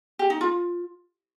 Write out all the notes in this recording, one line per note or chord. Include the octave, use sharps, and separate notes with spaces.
G4
D#4
F4